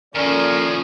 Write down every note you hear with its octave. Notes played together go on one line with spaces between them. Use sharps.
D#2 F3 A#3 C#4 A4 A#4 D5